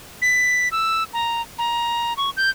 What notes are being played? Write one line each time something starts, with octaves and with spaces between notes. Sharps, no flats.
B6
E6
A#5
A#5
C#6
G6